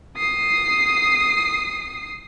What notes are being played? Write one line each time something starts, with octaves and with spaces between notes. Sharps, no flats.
D#6 C7